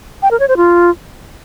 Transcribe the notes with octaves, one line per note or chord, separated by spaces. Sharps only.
G5
A#4
C#5
C5
F4